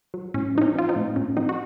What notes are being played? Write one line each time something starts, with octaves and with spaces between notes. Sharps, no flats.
F#3
A2 C#4
F3 D#4
C#4
F3 F4
C4 D#4
A2
A2 C#4
F3 C4 D#4
F#4